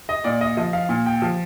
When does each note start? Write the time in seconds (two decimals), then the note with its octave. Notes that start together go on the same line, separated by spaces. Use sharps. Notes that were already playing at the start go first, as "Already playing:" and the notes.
0.09 D#5
0.24 A#2 D5
0.41 D#5
0.57 F3 D#5
0.73 F5
0.89 A#2
1.06 G5
1.22 F3